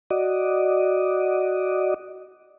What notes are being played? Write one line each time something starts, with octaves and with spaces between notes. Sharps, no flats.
F#4 D5 D#5